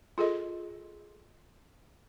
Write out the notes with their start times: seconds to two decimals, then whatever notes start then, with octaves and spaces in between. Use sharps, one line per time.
0.18 F4 G#4 A4 D#5